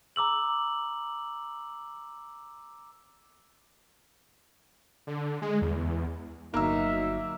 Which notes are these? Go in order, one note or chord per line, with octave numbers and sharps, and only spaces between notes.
A#5 D6 E6 F#7
D3
G#3
E2
G1 F#3 A#3 D#4 E5 E6